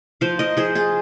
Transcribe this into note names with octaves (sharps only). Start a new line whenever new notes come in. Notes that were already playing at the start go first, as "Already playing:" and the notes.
F3 C5 F5
F3 A#4 D#5
F3 G#4 C5
F4 G#4